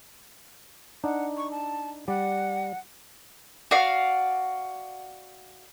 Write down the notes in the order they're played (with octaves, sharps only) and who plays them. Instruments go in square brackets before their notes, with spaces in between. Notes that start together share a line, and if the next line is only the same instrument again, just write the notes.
[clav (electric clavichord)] D4 D#4 [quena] F#5
[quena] C#6
A5
[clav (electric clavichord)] G3 D5 [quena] F#5
[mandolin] F#4 D5 F5